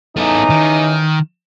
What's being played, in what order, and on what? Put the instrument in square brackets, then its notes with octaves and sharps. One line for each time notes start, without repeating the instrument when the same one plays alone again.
[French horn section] C#3 E3 D#4 [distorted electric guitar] B3 A4
[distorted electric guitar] D#3